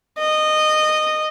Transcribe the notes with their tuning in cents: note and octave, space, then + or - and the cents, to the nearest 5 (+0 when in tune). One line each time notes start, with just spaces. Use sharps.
D#5 -15